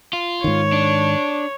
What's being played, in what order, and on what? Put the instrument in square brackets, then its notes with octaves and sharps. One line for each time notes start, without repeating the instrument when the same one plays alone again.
[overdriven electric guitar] F4
[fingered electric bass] G#2 D#3 [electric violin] C#5
[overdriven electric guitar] D4